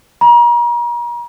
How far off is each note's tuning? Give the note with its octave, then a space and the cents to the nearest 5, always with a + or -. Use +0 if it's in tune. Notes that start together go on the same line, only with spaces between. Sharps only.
A#5 +40